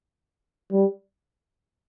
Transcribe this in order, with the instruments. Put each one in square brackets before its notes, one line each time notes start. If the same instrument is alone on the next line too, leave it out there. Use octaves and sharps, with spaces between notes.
[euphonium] G3